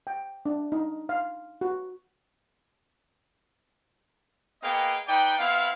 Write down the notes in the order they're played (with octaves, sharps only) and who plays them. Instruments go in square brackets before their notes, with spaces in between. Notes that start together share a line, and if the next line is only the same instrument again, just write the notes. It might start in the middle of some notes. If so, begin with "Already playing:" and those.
[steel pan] G5
D4
D#4
F5
F#4
[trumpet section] A#3 B3 G#4 D#5 F5 G5
D#4 B4 D5 G5
B3 C4 E4 F5